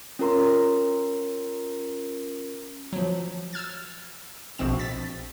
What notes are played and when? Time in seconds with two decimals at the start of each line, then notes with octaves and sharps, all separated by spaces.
0.19 C#4 F4 A#4 A#5 C6
2.93 F3 F#3
3.53 E6 F6 G#6 A6
4.58 A#1 B2 F3 C4 E7
4.79 A6 B6